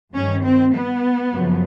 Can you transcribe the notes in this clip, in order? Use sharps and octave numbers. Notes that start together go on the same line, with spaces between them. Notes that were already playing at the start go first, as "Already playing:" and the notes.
G2 D#3 G3 C#4
C4
B3
F#2 C#3 F3